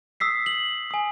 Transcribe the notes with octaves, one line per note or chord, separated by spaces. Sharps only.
D#6 E6 B6 C7
F#7
G#5 D#6